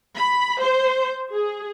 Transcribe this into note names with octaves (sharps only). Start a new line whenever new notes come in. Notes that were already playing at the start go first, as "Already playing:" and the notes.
B5
C5
G#4